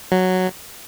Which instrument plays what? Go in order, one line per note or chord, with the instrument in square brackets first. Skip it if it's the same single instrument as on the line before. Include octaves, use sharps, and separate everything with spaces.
[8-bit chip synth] F#3